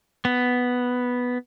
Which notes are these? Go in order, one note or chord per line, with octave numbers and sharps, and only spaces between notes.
B3